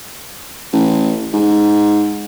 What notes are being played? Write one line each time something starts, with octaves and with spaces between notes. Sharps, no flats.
A1
G#2